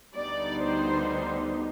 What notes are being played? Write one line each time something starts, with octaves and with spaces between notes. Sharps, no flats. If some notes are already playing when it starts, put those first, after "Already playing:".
D2 D3 G3 B3 D#4 D5
C5